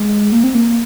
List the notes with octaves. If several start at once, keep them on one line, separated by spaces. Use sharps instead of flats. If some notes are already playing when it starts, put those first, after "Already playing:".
Already playing: G#3
A#3
C4
A#3